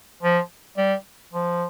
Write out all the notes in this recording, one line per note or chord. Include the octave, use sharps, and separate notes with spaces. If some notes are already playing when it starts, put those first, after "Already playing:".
F3
G3
F3